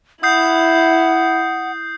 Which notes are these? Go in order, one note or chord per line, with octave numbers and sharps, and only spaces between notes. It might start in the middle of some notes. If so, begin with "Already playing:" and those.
E4 F#5 D#6 G6 C7